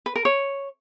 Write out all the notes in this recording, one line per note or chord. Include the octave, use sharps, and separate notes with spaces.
B4
A#4
C#5